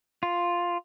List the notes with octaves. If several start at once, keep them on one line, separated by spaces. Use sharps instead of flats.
F4